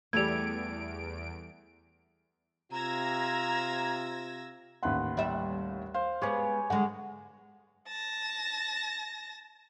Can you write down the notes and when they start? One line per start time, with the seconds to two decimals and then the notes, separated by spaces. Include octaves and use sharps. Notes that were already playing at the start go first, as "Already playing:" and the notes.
0.13 E2 G3 A3 E4 G#6 D7 F7
2.71 C3 F4 A#5 E6 G#6 A#6
4.83 A1 D#2 B4 F#5 C6
5.17 G3 E5
5.94 C5 F5
6.22 G#3 B3 G4 C#5 G#5
6.70 D3 G#3 F#5
7.88 A5 A#6